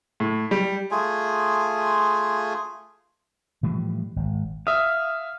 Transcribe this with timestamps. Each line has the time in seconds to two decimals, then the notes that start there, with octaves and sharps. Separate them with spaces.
0.20 A2
0.51 G3
0.91 A3 F4 G#4 G#5
3.63 A2 E3 F3 G3
4.16 G#1
4.67 E5 F5 D#6